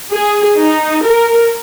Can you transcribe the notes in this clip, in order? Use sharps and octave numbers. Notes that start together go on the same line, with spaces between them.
G#4
D#4
A#4